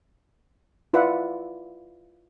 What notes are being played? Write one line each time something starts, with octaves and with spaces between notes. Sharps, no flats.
E4 F4 B4 D5 E5 F#5